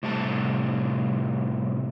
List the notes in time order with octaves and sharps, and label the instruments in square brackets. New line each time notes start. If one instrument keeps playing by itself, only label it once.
[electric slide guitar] A2 C3 G3 A3 A5